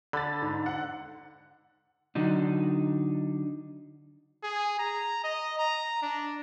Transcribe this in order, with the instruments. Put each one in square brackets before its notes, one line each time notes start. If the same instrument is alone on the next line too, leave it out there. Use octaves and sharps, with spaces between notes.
[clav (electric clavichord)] D3 [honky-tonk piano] B5 A6
[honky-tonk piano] G#2
F#5
[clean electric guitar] D3 F#3 D4 D#4
[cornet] G#4
A#5
D#5
A#5
D4